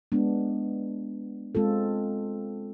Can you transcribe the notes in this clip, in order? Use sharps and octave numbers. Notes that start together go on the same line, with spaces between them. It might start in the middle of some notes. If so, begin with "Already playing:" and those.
G#3 B3 D4
G#3 C4 F4 A4